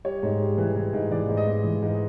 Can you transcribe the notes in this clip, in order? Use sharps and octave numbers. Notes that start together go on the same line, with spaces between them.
G3 C#5
G#2
G3
E3
E3
G#2
E3 D5
G#2
D#5
G#2
E3
G#2